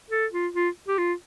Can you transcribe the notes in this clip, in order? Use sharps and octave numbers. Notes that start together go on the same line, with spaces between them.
A4
F4
F4
G4
F4